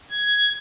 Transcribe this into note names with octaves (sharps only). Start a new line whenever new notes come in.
G#6